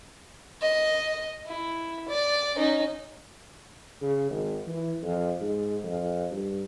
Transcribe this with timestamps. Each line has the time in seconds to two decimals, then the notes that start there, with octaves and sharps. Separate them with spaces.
0.62 D#5
1.46 E4
2.08 D5
2.56 C#4 D#4
4.01 C#3
4.30 G#1
4.67 E3
5.03 F2
5.41 G#2
5.84 F2
6.31 G2